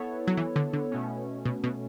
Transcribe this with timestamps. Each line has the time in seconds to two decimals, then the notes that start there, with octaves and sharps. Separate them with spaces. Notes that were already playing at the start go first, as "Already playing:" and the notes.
Already playing: B3 E4 A4 C#5
0.27 F#3
0.37 E3
0.56 D3
0.73 D3
0.91 B2 A3 C#4
1.45 B2
1.64 B2